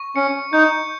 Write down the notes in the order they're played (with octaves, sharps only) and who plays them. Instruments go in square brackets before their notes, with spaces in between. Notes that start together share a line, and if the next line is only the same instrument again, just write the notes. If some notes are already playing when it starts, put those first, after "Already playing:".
Already playing: [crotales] C#6
[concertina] C#4 [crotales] C#7
[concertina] D#4 [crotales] G6